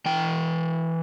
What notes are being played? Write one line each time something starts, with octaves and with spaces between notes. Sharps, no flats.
E3 G5